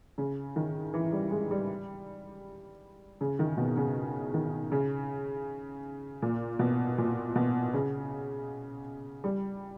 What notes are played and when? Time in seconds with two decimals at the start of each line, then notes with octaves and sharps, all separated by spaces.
0.18 C#3
0.56 D#3
0.94 E3
1.12 G3
1.31 G#3
1.51 G3
3.21 C#3
3.39 D#3
3.57 B2
3.77 C#3
4.34 D#3
4.72 C#3
6.22 A#2
6.59 B2
6.98 A#2
7.35 B2
7.74 C#3
9.24 G3